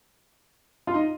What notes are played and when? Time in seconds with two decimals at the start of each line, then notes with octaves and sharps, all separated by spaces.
0.87 F4
0.94 D#4